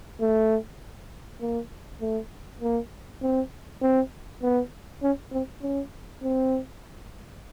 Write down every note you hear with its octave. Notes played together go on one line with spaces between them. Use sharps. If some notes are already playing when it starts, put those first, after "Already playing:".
A3
A#3
A3
A#3
C4
C4
B3
C#4
C4
C#4
C4